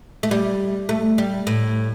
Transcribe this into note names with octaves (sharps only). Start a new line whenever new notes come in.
A3
G3
A3
G3
A2